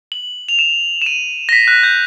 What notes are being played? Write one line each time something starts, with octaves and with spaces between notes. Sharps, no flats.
F#7
F7
E7
E7
D#7
A#6
B6
F#6
G6